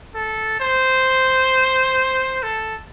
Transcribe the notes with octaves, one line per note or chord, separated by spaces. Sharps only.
A4
C5
A4